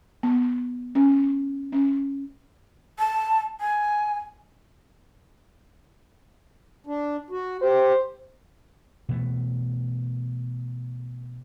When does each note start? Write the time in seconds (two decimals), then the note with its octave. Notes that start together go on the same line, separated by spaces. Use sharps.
0.23 B3
0.95 C#4
1.72 C#4
2.99 A5
3.61 G#5
6.87 D4
7.30 F#4
7.62 G4 C5
9.09 B2 E3 A3